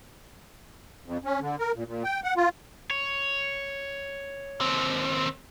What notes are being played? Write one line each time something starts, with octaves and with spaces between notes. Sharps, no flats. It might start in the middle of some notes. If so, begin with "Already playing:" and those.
F2
C#4
D3
A#4
A#2
A#2
G5
F#5
F4
C#5
D#2 C4